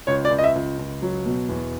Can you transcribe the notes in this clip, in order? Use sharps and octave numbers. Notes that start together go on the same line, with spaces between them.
C#2 C#5
D5
C#2
D#5
E5
C#2
C#2
F#3
B2
E2